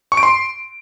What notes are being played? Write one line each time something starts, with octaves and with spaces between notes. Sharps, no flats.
C#6
D7
C6